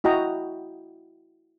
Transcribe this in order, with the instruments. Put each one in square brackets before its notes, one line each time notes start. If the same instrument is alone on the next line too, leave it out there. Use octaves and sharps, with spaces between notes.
[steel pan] E4 F#4 D#5 G5 A#5